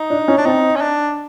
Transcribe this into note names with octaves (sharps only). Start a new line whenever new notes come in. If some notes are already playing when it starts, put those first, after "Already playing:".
Already playing: D#4
D4
C#4
D4
C4 D#4
C#4
D4